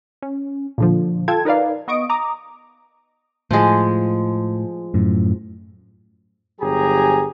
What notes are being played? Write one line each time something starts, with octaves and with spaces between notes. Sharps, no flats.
C#4
A#2 D3 F3
F4 A4 G5 A5 G#6
D#4 A#4 B4 D5 F5
B3 D#5 C#6 D#6 D7
A#5 D6 D#6
A2 F3 G#3
F#2 A2
G1 F#3 G4 G#4 G#5 A#5